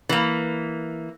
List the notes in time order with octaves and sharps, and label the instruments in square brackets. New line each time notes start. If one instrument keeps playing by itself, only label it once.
[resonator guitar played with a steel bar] E3 A#3